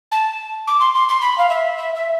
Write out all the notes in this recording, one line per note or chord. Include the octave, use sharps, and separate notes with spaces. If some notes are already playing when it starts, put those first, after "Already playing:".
A5
D6
C6
C6
C6
B5
F5
E5
E5
E5